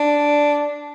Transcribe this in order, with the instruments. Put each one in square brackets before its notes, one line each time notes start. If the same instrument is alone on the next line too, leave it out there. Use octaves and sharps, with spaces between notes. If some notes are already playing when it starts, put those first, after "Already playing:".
Already playing: [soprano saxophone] D4